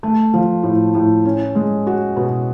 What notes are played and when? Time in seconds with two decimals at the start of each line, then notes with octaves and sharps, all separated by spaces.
0.03 A3
0.34 F3
0.63 A2
0.95 A2
1.25 C#4
1.55 G#3
1.87 F#4
2.16 B2